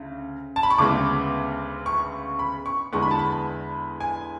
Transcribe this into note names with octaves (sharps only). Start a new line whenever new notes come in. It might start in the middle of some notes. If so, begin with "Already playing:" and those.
Already playing: D2 C#3
A5
B5
C#6
D2 C#3 G#3 B3 D6
C#6
B5
C#6
E2 D3 G#3 B3 C#6
B5
A5
B5
G#5